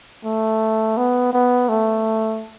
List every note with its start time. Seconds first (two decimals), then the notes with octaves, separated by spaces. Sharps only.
0.25 A3
0.97 B3
1.33 B3
1.69 A3